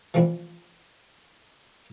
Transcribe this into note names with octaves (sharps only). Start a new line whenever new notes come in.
E3 F3 A3 C4 D4 E4